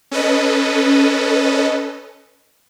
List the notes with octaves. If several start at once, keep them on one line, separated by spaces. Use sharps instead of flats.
C#4 A4 B4 D#5